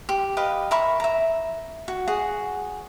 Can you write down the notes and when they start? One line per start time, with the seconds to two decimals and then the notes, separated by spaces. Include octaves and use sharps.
0.09 G4
0.37 G4 B4 D#5 F5
0.71 A#4 E5 B5 C#6
1.00 E5 A#5
1.88 F#4
2.08 F#4 G#4 F#5